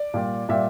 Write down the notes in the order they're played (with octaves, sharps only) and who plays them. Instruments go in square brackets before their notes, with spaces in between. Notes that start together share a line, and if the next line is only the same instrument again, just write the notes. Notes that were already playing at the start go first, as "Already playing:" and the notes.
Already playing: [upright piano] D5
A#2 G3
A#2 G3 E5